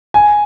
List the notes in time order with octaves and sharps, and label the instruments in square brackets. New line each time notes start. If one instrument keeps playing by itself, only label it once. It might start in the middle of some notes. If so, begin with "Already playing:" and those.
[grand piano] G#5